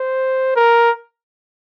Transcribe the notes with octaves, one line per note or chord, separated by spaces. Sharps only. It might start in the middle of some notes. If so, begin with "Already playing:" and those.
Already playing: C5
A#4